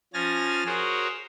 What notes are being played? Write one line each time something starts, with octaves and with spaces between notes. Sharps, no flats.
F3 C#4 G#5 F6 A6 A#6
F#4 G#4 A#4 C5 C#5